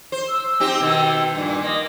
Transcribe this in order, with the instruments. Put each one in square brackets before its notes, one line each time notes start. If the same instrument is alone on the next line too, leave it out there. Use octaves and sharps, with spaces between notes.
[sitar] C5
[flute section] E6
[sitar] C4 D#4 G4
B2 D#3
G2 A#2
[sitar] A#3 [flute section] D#5